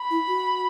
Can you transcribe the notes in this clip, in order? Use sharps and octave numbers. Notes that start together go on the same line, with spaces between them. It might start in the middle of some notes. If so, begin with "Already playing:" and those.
Already playing: B5
E4
F#4